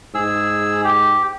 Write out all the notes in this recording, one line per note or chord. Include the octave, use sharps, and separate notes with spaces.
G#2 G#4 E6
G4